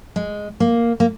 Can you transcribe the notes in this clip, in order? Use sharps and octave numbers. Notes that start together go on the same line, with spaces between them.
G#3
A#3
A#3